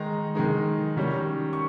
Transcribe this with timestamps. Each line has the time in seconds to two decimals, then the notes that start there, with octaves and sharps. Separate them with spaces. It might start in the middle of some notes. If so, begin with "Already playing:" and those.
Already playing: D#3 G#3 D#4 A#5
0.35 D#3 G#3 D#4
0.97 D#3 G3 C#4
1.53 C#6